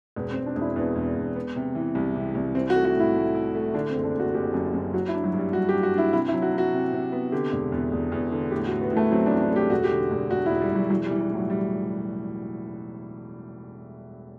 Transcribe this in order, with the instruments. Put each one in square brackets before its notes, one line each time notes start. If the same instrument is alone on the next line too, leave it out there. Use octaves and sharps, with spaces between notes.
[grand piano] E1 [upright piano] B3
[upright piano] C4
[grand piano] E1
[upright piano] D4
[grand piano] E1 [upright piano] E4
[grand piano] E2 [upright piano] B3
[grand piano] E1
E1
B3
C3
E3
C2
C3
C2
[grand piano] E3 [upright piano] C4
[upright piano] F#4
[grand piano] A3
[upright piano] F#4
[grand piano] A2
[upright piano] E4
[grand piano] A3
E4
A3
[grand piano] D3 [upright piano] D4
[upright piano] C4
[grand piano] F#1
[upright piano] D4
[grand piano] F#1
[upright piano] F#4
[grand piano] F#1 [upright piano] G4
[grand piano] F#2
F#2
[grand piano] F#3 [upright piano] F#4
[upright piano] E4
[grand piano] D4
[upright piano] F#3
[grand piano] G2
[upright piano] G3
[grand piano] G2 [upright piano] F#4
[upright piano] G4
[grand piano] G2
[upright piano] F#4
[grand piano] D4 [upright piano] E4
[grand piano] C3 [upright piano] E4
[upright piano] E4
[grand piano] F#3
[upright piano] F#4
[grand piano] F#3
[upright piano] F#4
[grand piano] C3
C3
B3
[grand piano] D3 [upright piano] G4
[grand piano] E1
E2
E1
E2
D3
[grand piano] A2 [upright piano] G4
[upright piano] F#4
[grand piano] A2
[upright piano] B3
[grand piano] A2
[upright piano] A3
[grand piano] F#3 [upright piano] C4
[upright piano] D4
[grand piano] A1
[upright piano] D4
[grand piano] A3 [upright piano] G4
[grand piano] E1 [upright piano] F#4
[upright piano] G4
[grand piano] D3
E1
[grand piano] E1 [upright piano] F#4
[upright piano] E4
[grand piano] E1
[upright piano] G3
[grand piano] E1 [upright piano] F#3
[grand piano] E3 [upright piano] F#3
[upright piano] G3
[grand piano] E3
[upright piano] G3
[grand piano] A2 [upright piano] F#3
[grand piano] E3 [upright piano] G3